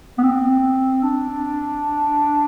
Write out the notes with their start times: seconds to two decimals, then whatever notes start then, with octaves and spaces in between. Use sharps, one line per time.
0.18 B3
0.23 C4
1.03 D4